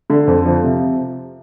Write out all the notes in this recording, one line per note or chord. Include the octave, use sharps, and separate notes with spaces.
D3
F2
F3
C3